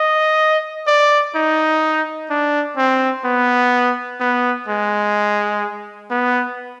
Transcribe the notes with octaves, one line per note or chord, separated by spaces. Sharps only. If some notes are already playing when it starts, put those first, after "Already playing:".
Already playing: D#5
D5
D#4
D4
C4
B3
B3
G#3
B3